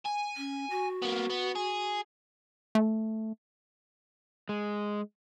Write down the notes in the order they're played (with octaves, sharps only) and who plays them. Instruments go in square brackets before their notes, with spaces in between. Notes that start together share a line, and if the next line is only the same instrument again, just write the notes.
[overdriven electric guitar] G#5
[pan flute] C#4
F#4
[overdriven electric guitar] A#3 B3
B3
G#4
[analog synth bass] A3
[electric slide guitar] G#3